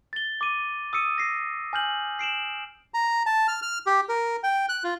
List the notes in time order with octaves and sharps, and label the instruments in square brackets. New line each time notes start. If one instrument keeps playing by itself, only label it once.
[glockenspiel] A6 G7
D6 D#7
D#6 E6 C#7 D#7
A#6 C7
G#5 F6 G6 F#7
C7 D7 E7 F#7
[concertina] A#5
A5
F6
F6
G4
A#4
G5
F#6
F4